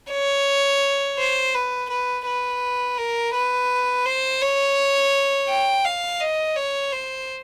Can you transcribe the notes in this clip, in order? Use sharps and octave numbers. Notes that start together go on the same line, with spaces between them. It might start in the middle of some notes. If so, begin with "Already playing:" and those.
C#5
C5
B4
B4
B4
A#4
B4
C5
C#5
G5
F5
D#5
C#5
C5